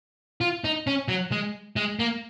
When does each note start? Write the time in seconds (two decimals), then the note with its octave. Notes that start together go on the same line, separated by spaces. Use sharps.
0.41 F4
0.64 D#4
0.87 C#4
1.08 F#3
1.32 G#3
1.76 G#3
1.99 A#3